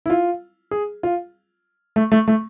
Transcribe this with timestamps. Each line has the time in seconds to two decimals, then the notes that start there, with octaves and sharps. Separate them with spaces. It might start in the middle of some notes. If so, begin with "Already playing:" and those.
0.06 E4
0.10 F4
0.71 G#4
1.03 F4
1.96 A3
2.12 A3
2.28 A3